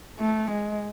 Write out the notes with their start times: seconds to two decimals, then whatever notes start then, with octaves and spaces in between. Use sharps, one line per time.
0.20 A3
0.51 G#3